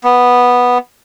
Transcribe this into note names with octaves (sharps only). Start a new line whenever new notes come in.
B3